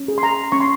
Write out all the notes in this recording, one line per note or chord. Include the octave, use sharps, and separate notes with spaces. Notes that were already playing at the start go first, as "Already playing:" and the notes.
Already playing: C#4
G#4
C6
A#5
C#4 C#6
C6